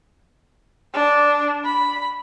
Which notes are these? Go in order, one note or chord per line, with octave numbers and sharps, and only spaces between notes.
D4
B5